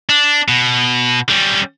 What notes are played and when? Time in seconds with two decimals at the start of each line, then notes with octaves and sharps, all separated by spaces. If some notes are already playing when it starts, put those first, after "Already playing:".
0.09 D4
0.48 B2
1.29 G3 C#4